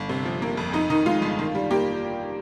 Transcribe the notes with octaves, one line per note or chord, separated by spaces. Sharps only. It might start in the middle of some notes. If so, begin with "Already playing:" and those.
Already playing: G1
C3
F3
A#3
F2
F2 D#4
D#3 D#4
G#3 F4
G1
D#3
G3
A#3 G4